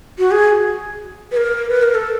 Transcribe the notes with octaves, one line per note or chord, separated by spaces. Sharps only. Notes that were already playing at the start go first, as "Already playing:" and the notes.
F#4
G#4
B4
A#4
B4
A#4
A4